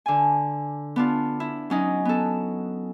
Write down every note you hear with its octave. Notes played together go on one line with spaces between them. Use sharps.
D3 G#5
B3 D4 F4
E4
F#3 C#4 D#4
B3 A4